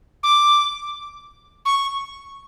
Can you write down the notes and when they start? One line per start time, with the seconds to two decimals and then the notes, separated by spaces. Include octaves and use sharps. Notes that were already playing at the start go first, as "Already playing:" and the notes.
0.23 D6
1.66 C#6